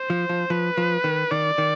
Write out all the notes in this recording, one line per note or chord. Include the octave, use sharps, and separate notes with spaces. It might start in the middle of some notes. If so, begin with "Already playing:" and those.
Already playing: C5
F3
F3
F3 B4
F3
D#3
D#3 D5
D#3